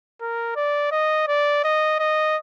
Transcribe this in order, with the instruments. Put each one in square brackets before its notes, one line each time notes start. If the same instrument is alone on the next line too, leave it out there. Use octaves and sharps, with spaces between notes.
[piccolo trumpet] A#4
D5
D#5
D5
D#5
D#5